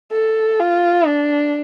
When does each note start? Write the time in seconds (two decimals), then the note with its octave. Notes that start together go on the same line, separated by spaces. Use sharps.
0.12 A4
0.60 F4
1.07 D4